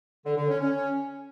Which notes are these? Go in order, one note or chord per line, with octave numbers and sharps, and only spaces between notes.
D3
D3
C#4
C#4